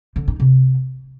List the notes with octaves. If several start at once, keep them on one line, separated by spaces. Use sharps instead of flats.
D3
D#4
C3